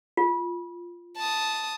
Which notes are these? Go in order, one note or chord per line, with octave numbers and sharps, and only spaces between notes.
F4
A5 D#6